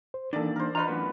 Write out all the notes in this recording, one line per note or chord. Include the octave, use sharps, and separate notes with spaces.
C5
A#2 D#3 E3 D4 A4 D5
A#4 C5
F4 B4 D#5 A#5
F#2 A2 B3